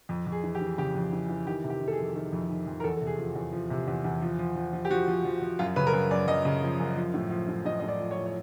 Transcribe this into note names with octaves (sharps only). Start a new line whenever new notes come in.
F2
F2
G#4
E3
G4
E3
C#3 G4
F2
E3
E3
D#3 G4
C3
G4
D#3
A4
G#4
F2
D#3 A4
F2
D#3
F2
A#4
E2 A4
C3 A4
G#4
F3
E2
F3
C3
E2
E2
F3
F3
F3
F3
G4
F3 F#4
F3
F3
F3
F#2 F4
C#3 B4
A#4
F#2 B4
F#2 D5
F#2 D#5
C#3
F3
F#2
F3
A2
F3
A2
A2 D#5
A2 D#5
D5
F3
C#5
F3
C#5